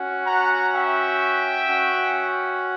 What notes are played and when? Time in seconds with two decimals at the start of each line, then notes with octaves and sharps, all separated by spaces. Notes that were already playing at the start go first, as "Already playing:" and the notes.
Already playing: C#4 F#4
0.27 F#5 A#5
0.74 E5 G5
1.67 C#4 F#4